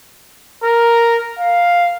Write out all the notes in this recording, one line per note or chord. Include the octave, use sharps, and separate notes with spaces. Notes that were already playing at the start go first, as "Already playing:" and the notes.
A#4
F5